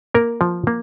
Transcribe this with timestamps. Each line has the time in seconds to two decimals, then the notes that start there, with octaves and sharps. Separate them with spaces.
0.14 A#3 A#4
0.41 F3
0.67 A#3